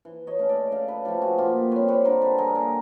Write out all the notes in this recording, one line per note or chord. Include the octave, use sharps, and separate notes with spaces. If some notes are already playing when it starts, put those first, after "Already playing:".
E3
C#5 D#5
A3 C#4
D5 E5
C#3 D#5 F5
A4 B4
F3 A3 G4 A4
F#4 G#4
A#2 F4 G4
G3 C4 B4 C#5
B4 C#5
D3 A#4 C5
A4 B4
G3 A#3 G#4 A#4
G#4 A#4